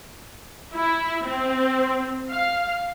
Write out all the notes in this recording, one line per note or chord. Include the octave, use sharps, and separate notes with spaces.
E4
C4
F5